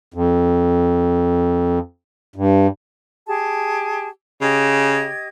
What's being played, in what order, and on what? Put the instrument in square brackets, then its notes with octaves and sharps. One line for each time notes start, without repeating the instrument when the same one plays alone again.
[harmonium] F2
G2
[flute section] G4 G#4 A5
[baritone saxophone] C#3 [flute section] G4 D#5 G#6